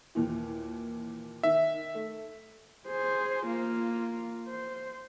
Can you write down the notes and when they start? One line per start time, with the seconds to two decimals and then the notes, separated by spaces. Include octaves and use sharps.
0.15 D#2 A#2 E3
1.43 D#3 E5
1.95 A3
2.87 G#4 C5
3.46 A#3 F4
4.48 C5